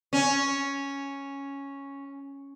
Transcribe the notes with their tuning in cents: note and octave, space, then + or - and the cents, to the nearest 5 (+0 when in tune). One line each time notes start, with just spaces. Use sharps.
C#4 +0